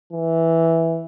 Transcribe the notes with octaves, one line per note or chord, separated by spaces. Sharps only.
E3